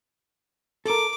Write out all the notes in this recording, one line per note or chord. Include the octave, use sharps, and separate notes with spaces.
A4 A#4 D6